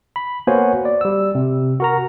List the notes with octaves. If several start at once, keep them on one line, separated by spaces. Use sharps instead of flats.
B5
A#3 B3 F#4 C5 C#5 G#5
D5
G3 E6
C3
F#4 A#4 A#5